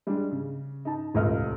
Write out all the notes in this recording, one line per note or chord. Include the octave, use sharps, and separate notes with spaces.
G3 G#3 D4
C#3
D#4 A5
D#1 C#2 A3 D#5 F6